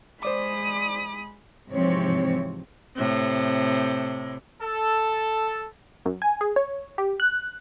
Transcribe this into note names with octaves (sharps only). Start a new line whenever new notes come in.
G#3 C5 D5 B5 D6 D#6
G#2 C3 E3 F3 C4 C#5
A2 C3
A4
F#2
G#5
G#4
C#5
G4
F#6